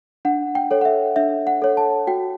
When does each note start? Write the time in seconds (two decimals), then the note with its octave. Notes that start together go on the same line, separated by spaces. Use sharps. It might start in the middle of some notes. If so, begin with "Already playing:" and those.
0.25 D4 F#5
0.55 G5
0.71 A4 C#5
0.81 F#5
0.85 E5
1.16 D4 E5
1.47 F#5
1.62 A4 C#5
1.77 A5
2.07 F#4 G5